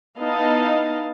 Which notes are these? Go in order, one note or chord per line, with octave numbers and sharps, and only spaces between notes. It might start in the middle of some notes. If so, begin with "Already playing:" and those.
B3 D#4 E4 D#5 F5 A5